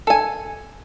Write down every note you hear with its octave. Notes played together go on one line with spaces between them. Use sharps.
A4 G#5